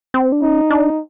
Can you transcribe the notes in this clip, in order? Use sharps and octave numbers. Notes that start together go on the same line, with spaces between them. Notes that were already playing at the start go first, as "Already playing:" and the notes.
C4
D4
C#4 D#4
D4